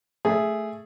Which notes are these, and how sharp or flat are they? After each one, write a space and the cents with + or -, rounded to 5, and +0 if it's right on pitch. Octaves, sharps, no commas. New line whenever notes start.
A3 +0 G#4 +0